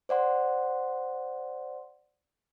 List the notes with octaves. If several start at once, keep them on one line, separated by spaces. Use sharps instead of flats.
C5 D5 F#5 C6